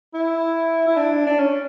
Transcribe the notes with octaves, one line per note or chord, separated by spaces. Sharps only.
E4
E4
D4
D4
C#4